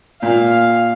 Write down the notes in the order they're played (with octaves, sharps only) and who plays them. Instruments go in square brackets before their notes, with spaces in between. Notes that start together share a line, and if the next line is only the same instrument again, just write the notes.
[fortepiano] A#2 [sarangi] F5